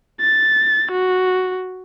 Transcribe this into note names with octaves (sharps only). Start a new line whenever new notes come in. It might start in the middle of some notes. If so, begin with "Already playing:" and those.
A6
F#4